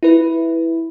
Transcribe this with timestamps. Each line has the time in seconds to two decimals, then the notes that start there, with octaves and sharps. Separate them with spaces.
0.03 E4 B4